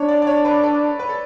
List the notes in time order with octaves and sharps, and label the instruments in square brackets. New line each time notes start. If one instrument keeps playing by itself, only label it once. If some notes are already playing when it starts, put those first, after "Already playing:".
Already playing: [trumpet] D4 [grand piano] C#5
[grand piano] D5
D5
C#5
B4
A4
B4
A4